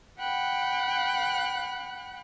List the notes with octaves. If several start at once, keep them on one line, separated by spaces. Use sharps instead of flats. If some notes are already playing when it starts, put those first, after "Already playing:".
F#5 G5 B5 F#6